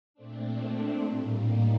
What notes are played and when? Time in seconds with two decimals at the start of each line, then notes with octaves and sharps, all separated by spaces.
0.14 A#2 A3 C4 D4
1.02 A2 G3 A#3
1.47 D#4